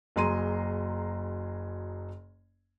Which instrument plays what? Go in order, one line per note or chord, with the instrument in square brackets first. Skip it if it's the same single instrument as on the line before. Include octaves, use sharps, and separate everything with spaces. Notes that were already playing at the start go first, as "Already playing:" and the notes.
[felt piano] F#1 F#3 G#4 A#5 C6 D#7